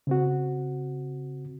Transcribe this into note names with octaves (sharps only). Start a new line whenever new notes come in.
C#3 C4 F#4